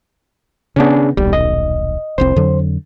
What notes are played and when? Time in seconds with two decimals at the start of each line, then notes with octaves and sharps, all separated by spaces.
0.76 C#3 B3 C#4 D4 G#4
1.17 D#1 B1 G3
1.33 D#5
2.18 F1 C2 C4 C5
2.36 F2 D3 F#3